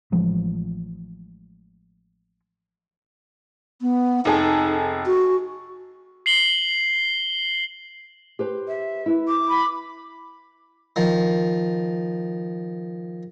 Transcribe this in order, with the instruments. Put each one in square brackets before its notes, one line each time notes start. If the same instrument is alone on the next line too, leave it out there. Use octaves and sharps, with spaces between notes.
[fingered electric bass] A1 F3 G#3
[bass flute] B3
[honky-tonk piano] F1 G#4 A4 [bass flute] D#4
[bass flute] F#4
[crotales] C7 F#7 G7
[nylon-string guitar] G4 B4 C5
[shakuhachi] E5
[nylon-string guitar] E4 B4
[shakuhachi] D6
[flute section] B5
[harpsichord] D#3 F3